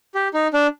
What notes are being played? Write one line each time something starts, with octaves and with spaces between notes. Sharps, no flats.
G4
D#4
D4